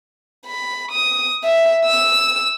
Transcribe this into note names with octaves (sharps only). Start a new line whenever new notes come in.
B5
D#6
E5
E6